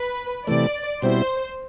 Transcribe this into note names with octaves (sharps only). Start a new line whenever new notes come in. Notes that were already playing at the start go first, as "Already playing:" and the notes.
Already playing: B4
C3 E3 A3 D5
B2 G3 C4 E4 C5